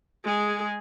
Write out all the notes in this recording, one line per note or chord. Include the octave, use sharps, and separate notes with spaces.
G#3 G#4